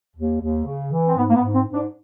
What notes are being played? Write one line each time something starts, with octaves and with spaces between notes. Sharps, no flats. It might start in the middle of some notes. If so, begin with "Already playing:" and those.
D#2
D#2
C#3
E3
C4
G#2 B3
A#3
B3
G#2
C4
G#2
D4